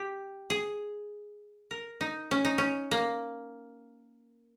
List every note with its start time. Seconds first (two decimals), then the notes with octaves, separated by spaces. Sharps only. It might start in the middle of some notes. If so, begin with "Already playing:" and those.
Already playing: G4
0.50 G#4
1.71 A#4
2.01 D#4
2.31 C#4
2.45 D#4
2.58 C#4
2.91 A#3